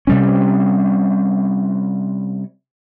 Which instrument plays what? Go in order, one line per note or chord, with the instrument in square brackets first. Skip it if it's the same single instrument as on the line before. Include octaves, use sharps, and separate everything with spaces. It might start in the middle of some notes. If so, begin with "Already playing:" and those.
[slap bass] C3 G3 C#4